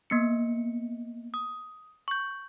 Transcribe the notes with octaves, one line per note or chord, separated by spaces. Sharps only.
A#3 B3 C#7
D#6
C#6 G6